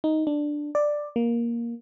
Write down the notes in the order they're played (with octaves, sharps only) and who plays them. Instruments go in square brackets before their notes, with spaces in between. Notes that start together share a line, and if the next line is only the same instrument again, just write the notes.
[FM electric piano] D#4
D4
D5
A#3